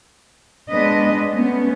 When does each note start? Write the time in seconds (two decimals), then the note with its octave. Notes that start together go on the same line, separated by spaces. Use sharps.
0.70 G#3 B3 D4 B4 D#5
1.33 A3 B3 C#4